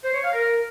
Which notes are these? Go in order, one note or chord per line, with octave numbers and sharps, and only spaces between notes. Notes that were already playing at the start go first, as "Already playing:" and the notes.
C5
C#5
F5
A#4